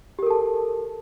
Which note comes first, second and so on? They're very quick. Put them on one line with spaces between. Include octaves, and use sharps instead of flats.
G4 A#4 A4 A5